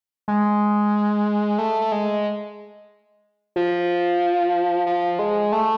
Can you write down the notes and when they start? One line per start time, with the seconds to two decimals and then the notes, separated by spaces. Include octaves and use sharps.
0.28 G#3
1.59 A3
1.81 A3
1.92 G#3
3.56 F3
4.86 F3
5.19 G#3
5.52 A3